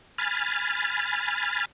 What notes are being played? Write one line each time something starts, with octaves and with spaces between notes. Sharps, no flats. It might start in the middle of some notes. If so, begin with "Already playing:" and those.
G#5 B5 F6 A6